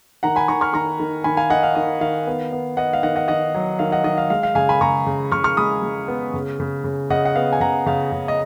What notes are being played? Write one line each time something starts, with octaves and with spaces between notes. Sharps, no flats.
D#3 F#5 A#5
G#5 B5
D#3 A#5 C#6
C#6 F6
D#3 A#5 C#6
D#3
D#3 G#5 B5
F5 G#5
D#3 D#5 F#5
F5
D#3 D#5
D#3 F5
B3
B3
B3 D#5 F#5
F5
D#3 D#5 F#5
D#5 F#5
D#3 D#5 F#5
F#3
D#3 F5
D#5 F#5
D#3 D#5
F5
G#3 F5
F5
C#3 F5 G#5
G#5 B5
C#3 A#5 C#6
C#3
C#3 C#6 F6
C#6 F6
G#3 B5 D#6
G#3
B3
C#3
C#3
C#3
C#3 D#5 F#5
F#5
B3 F5
G#5
C#3 F#5 A#5
C#3 F5
C#3
D#5